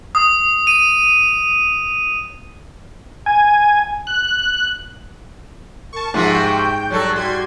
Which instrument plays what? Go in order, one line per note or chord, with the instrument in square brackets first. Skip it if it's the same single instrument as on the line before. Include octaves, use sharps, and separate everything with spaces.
[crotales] D#6
D#7
[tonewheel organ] G#5
F#6
[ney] A#4 [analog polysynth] A5 C#6
[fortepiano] G#2 [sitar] C3 F3 F4 [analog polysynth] F#5
[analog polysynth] G5 G6 [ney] C#6
[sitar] F#3 G3 A4 [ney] C#6
[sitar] G3 [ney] F#4 [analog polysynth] C6 G#6